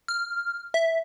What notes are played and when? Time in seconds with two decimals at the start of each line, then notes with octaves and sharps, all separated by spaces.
0.08 F6
0.74 E5